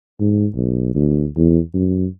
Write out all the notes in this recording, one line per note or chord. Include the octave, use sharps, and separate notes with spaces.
G#2
B1
D2
E2
F#2